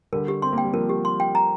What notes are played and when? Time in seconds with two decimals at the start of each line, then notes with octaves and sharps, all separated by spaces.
0.13 D3 G3 A#4
0.28 G4
0.42 C4 C6
0.53 A#3 G5
0.64 G3
0.74 F3 A#3 A#4
0.89 G4
1.05 C6
1.20 G5
1.35 A#5